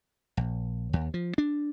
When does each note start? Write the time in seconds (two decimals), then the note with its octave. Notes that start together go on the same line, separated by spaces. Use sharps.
0.37 A#1
0.93 D#2
1.14 F3
1.38 D4